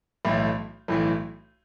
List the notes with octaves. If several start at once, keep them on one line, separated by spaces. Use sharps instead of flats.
B1 A2 E3 A3
B1 A2 E3 A3